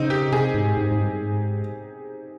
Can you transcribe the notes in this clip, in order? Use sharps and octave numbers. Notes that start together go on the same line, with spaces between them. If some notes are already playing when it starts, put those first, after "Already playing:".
Already playing: C#3 C4 D#4
G4
C3 G#4
G#2
G#2
G#2
G2
G#2